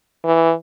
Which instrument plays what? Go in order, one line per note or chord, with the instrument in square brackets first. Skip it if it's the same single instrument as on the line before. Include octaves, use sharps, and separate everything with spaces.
[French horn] E3